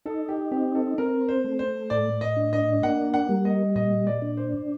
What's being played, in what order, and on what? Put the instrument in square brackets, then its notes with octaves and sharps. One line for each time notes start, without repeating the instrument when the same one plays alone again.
[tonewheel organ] D#4 [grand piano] A4
[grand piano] G4
[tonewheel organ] C4 [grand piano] G4
[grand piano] A4
[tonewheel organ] C4 [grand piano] A#4
[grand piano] C5
[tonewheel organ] A3
[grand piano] C5
[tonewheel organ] A2 [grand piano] D5
[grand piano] D#5
[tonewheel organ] D4
[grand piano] D#5
[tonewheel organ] A#3 [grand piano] F#5
[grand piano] F#5
[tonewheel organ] G3
[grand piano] D#5
[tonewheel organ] A#2 [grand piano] D#5
[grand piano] D5
[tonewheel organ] D4
[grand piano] C5